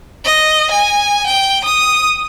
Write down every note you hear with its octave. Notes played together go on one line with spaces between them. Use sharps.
D#5
G#5
G5
D#6